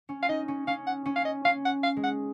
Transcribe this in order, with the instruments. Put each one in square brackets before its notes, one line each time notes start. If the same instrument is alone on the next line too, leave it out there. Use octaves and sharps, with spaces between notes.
[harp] C#4
[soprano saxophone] F5
[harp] D#4 [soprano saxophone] D#5
[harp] C#4
[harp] C#4 [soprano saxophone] F5
[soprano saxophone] F#5
[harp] C#4
[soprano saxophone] F5
D#5
[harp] C#4 [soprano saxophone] F5
[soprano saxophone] F#5
F5
[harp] G#3
[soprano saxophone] F#5